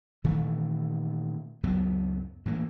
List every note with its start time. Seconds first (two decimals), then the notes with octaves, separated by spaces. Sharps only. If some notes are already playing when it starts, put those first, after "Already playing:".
0.24 A#2 D#3 E3 A3
1.63 C#2 F#2 F#3 B3
2.45 A2 E3 A#3